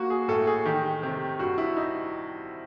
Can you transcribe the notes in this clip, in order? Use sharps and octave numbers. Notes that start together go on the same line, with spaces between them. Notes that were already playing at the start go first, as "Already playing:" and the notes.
Already playing: A#3 F#4
G#4
A2 A4
G#4
D#3 G4
C3
G2 F#4
E4
D#4